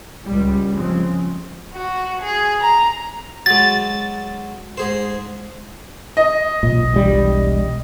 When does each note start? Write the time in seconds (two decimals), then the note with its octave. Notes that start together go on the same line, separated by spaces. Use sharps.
0.25 C#2 G3
0.76 C#3 F3 G#3 C4
1.74 F#4
2.22 G#4
2.61 A#5
3.46 F#3 G#3 A6
4.77 G#2 G#4 C5
6.17 D#5
6.63 B1 A#2
6.94 E1 G3